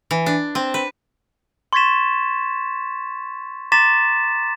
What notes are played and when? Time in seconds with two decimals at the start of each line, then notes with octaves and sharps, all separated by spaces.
0.11 E3
0.26 D4
0.55 C4
0.74 B4
1.73 C6 C#6 G#6 A6 B6 E7
3.72 A#5 C6 D6 A6 B6 E7